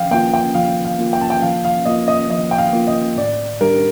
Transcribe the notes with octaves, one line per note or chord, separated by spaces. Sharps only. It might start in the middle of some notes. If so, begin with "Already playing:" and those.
Already playing: F3 F5 G5
A#3 F4 G5
G5
F3 F5
F5
A#3 F4
G5
A5
G5
F3 F5
F5
A#3 F4 D#5
D#5
F3 D#5
G5
F5
A#3 F4
D#5
A2 D5
G3 D4 G4 A#4